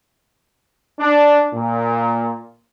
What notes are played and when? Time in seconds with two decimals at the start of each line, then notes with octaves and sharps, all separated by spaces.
0.99 D4
1.53 A#2